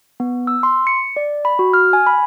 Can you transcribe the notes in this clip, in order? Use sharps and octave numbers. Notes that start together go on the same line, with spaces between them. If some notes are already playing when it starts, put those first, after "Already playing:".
B3
E6
C6
C#7
D5
B5
F#4
F6
G#5
B5